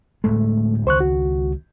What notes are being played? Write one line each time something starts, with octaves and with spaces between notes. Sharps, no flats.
D1 A2 G#3 A3
C#2 D#3 C5 C#6 F#6
F#4